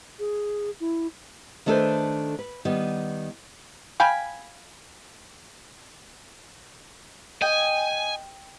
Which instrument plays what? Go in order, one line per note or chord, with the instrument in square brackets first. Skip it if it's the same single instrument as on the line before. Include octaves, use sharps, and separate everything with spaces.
[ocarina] G#4
E4
[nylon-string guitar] D#3 A3 D4 A4 B4 C5
B4
D#3 G3 B3
[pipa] F5 G5 G#5 B5
[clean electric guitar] D#5 [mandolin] G5 [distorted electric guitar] G#5